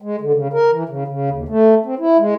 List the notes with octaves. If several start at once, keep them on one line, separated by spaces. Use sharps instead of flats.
G#3
D3
C#3
A#4
E3
C#3
C#3
D#2
A3
C4
E4
G#3